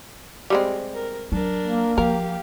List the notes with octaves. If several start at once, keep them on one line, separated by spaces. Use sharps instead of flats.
G3 G#3 C4
A#4
F#3 D4 A#4
A#3
F3 G4 A#4 F5